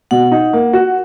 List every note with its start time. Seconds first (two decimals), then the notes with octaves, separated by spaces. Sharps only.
0.11 B2 F#5
0.32 D#4
0.53 A#3
0.73 F#4